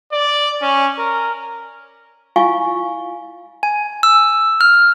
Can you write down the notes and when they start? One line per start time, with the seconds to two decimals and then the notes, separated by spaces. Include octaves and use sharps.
0.12 D5
0.61 C#4
0.98 A#4
2.36 E4 F4 F5 G#5 C#6
3.63 G#5
4.03 E6
4.61 F6